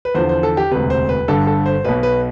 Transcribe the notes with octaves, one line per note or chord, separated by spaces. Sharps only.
B4
E2 D3 F3 C5
C5
A4
G4
E1 D2 C3 B4
C5
B4
G1 G2 D3 A4
A4
C5
B1 B2 B4
B4